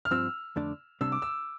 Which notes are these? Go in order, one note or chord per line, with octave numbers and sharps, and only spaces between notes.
F6
G2 F3 C4 E6
F2 D3 A3 D4
C2 C3 G3 D4 E6
D6
E6